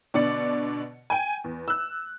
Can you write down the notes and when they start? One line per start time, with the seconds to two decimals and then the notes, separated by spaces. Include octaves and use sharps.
0.14 B2 D3 D5 C#7
1.10 G5 G#5
1.44 E2
1.68 E6 F#6